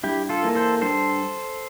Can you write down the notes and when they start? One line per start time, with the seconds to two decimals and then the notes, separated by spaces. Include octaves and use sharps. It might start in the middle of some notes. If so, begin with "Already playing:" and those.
0.04 G2 E4 G4
0.29 F4 A4
0.43 E3 A#3
0.55 A4 C5
0.81 G2 A4 C5